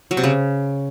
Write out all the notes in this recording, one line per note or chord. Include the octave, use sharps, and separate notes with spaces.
F#3
C3
C#3